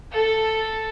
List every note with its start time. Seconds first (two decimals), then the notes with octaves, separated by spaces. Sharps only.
0.13 A4